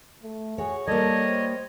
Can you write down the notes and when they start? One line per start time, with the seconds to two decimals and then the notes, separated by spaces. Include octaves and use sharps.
0.23 A3
0.58 F#4 G#4 C#5
0.87 G3 A#3 A4 C#5 D#5
1.26 C5